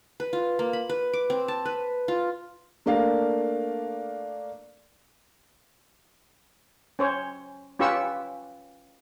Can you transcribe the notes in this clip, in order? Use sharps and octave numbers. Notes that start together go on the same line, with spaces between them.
B4
F4
A#3
B5
B4
D6
C4
A5
B4
F4
A3 A#3 D4 A#4 D5 F5
C#4 C5 C#5
C#4 F4 G4 B4 C#6 E6